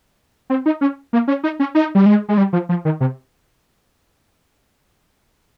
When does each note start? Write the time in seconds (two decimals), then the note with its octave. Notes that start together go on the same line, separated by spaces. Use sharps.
0.50 C4
0.66 D#4
0.81 C#4
1.13 A#3
1.28 C#4
1.44 D#4
1.60 C#4
1.75 D#4
1.95 G3
2.06 G#3
2.29 G#3
2.38 G3
2.53 F3
2.69 F3
2.85 D#3
3.01 C3